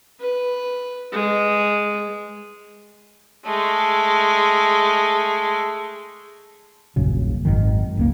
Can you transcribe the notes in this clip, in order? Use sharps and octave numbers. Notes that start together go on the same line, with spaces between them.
B4
G#3
G#3 A3
D#1 A#1 F#2 C#3
G#1 F#2 D#3
F#1 C#2 A#3